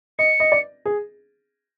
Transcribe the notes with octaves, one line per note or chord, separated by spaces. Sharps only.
D#5 C#7
D#5
D5
G#4